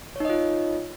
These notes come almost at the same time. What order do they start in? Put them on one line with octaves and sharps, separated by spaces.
C#5 D#4 D#5 F4